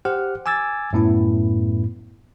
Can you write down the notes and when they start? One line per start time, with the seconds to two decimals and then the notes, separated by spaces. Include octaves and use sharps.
0.05 G4 C5 F#5 F6
0.46 G#5 D6 E6 G#6 A6
0.93 F#2 A2 B3 E4